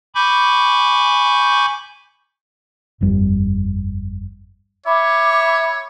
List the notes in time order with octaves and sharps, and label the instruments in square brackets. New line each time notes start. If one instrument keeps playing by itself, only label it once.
[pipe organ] G#5 B5 C#6 D6 G6
[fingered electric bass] G1 F2 G3
[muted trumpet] C#5 [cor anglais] E5 [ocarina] B5 [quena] D6